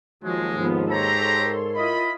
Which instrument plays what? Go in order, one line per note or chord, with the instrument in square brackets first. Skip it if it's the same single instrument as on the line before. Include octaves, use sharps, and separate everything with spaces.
[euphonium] D#2 [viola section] F3 F#3 [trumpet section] G#3
[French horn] G#2 [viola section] F3 B3
[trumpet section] G4 A#5 [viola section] A4 C#5 C6
[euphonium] A#4
[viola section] E4 F4 D#5 [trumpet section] B5